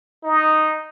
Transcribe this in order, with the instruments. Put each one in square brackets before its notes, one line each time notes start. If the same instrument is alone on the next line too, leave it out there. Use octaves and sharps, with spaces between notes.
[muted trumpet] D#4